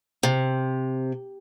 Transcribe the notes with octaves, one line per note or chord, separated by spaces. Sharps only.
C3